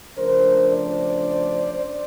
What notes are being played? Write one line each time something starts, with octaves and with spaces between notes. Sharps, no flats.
C#3 F3 A3 D4 A#4 C5
C5 D5
C5 D5